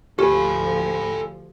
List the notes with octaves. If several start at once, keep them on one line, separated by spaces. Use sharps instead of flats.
D2 F3 G4 A4 G#5 B5